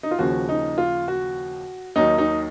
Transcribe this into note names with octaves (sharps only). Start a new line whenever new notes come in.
D#4
F4
D#2 C#3 F3 F#4
D#4
F4
F#4
D#2 D#3 F#3 D#4
D#4